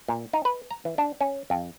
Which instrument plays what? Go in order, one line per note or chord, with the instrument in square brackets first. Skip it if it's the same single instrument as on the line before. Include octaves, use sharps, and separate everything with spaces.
[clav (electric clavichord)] A#2
D#4
B4
A#5
E3
D4
C#4
F2